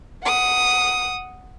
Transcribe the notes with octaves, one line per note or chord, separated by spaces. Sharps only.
F#5 D#6